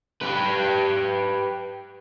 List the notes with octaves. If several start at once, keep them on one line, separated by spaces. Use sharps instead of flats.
G4 B4